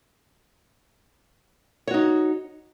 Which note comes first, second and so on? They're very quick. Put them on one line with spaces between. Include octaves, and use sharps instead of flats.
C#5 F#4 D#4